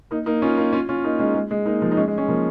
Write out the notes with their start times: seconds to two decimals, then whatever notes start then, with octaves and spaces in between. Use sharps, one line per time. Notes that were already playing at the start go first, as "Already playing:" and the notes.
0.11 A#3 D#4
0.26 A#3 D#4
0.42 C#4 F4
0.57 A#3 D#4
0.73 C#4 F4
0.89 C#4 F4
1.04 A#3 D#4
1.19 G#3 C#4
1.35 G#3
1.51 G#3
1.66 A#3 D#4
1.82 F3 A#3
1.92 D#4
1.97 G#3 C#4
2.08 G#3
2.18 G#3 C#4
2.29 F3 A#3